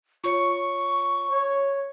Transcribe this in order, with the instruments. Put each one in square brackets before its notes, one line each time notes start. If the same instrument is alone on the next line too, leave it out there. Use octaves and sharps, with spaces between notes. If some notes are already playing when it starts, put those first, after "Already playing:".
[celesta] F4 C#5 C#7 [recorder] C#6
[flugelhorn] C#5